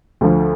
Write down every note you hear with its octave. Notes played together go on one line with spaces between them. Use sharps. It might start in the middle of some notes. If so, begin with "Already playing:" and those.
D2 D3 F3